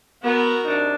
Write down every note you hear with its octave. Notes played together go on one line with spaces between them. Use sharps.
B3 F#4 A#4
C3 D4 D#4